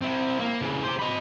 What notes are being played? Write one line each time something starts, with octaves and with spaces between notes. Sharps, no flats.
C4 E4
A#3
C#3 E3
G4 C5
D#5 B5